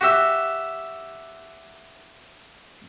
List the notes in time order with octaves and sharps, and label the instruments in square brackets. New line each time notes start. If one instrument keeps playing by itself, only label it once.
[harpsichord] F#4 G4 E5